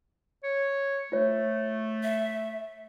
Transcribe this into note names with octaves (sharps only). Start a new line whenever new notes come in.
C#5
A3 F4 C#5
E5